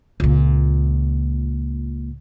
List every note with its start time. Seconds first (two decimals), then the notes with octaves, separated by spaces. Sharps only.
0.20 C#2 A#2